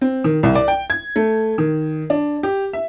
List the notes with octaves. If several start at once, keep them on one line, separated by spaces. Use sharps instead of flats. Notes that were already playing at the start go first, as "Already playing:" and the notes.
C4
D#3
C2
D5
G5
G#6
A3
D#3
D4
G4
E5